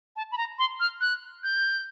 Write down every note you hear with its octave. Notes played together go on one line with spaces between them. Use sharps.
A5
B5
A#5
C6
F6
F#6
G6